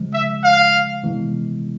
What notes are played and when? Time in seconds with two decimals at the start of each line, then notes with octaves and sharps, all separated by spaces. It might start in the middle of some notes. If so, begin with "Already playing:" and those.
Already playing: C#3 F3 G#3
0.13 E5
0.44 F5
1.03 C3 E3 G#3 B3